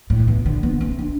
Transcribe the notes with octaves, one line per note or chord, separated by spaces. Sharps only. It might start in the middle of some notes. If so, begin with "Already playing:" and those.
A2
B2
D3
B3
C4
D4